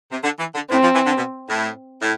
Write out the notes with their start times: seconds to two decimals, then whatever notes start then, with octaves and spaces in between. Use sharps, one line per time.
0.12 C3
0.23 D3
0.39 E3
0.54 D3
0.71 A2 C4
0.82 F3
0.94 E3
1.06 D3
1.17 B2
1.49 A2
2.02 A2